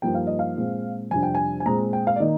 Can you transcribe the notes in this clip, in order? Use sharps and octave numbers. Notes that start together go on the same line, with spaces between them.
G2 F3 A#3 D#4 G5
F5
D#5
F5
A#2 G#3 C4
F2 C3 G3 D4 G#5
G5
G#5
G#5
A#2 G#3 C4 A#5
G5
F5
D5
D#3 A#3 D#4 D#5